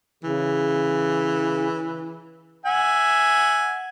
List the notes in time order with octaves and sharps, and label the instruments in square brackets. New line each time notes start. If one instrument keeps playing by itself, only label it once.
[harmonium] C#3 [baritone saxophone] E3
[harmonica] E5 F#5 G#5